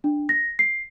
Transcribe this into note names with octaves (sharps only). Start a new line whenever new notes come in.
D4
A#6
C7